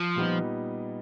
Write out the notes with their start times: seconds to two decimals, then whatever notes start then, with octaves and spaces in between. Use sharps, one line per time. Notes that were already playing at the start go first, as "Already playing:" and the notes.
Already playing: F3
0.16 A#2 G3 B3 D#4